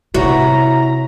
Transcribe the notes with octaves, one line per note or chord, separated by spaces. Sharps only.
C3 E4 F#4 B4 C#5 A#5